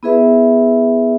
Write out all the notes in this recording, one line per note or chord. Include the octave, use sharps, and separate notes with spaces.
B3 E4 G#4 B4 E5